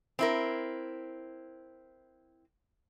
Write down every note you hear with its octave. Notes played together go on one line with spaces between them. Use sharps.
C4 E4 A#4